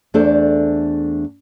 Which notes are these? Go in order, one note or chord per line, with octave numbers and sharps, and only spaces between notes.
E2 A3 D4 A4 C5 D5